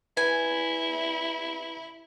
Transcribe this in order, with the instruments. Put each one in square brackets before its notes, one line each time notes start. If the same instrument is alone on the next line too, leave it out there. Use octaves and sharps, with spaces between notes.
[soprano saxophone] E4 [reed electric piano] B4 [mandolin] G#5